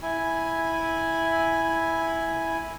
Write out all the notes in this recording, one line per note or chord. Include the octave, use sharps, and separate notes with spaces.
E4 G#5